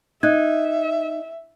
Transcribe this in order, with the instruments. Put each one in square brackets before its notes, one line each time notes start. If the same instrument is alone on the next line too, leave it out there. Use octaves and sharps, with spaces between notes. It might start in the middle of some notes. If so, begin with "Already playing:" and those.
[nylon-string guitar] D#4 [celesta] D#5 F#6 G#6 [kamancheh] E5